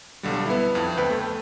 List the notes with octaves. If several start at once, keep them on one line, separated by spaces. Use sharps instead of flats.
B1 D3 G3
B3 E4
F2
D2 B4 G5
A3